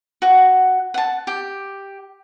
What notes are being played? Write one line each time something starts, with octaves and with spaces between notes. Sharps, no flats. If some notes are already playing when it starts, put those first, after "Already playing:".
F#4 F#5
F#5 A5
G4